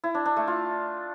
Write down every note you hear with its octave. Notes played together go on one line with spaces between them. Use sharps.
E4
D4
D4
A3
F4